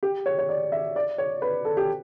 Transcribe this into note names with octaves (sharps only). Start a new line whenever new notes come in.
G4
C#5
C#5
D5
E5
D5
C#5
B4
A4
G4